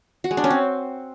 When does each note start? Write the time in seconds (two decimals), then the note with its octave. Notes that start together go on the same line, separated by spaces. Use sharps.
0.24 F#4
0.31 G#3
0.37 D4
0.44 C#4
0.50 C4